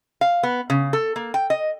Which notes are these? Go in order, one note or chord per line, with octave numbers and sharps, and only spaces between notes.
F5
B3
C#3
A4
A#3
G5
D#5